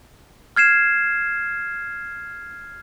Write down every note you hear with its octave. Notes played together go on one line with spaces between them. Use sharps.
F6 G#6 C7 E7